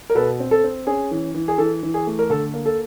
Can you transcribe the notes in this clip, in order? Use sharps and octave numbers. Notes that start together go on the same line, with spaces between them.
A#4
B2 A4 B4
C4
A4
C4
C#4 G#4
E3
E3
G#4
E3 A4
E3
G#4
A3
A#4
D3 A4
A#3
A4